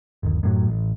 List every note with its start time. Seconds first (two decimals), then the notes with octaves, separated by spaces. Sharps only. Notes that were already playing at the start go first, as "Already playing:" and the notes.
0.23 G1 D#2
0.43 F#2 A2 F#3
0.68 A1